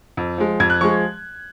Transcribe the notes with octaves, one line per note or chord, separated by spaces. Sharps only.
F2
F3 G#3
F2 G#6
F#6
F3 G#3 C#6